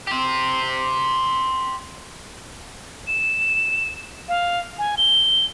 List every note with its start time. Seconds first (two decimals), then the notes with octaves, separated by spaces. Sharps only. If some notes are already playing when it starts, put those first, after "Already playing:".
0.07 G4 C5
3.07 E7
4.28 F5
4.79 G#5
4.97 G7